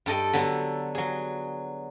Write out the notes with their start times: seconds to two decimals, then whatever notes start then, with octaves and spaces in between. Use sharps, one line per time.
0.06 G2 A4 D#5 G5
0.33 D3 F#3 B3
0.95 F#3 G#4